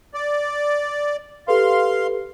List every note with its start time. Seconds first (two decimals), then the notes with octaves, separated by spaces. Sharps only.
0.14 D5
1.48 G4 A4 B4 F5 C6